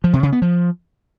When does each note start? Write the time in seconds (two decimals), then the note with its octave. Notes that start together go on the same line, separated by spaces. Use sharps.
0.04 F3
0.13 C3
0.23 C#3
0.32 B3
0.42 F3